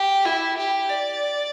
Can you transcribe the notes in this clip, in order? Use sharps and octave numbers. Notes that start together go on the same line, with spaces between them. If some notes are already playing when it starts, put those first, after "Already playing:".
Already playing: G4
E4
G4
D5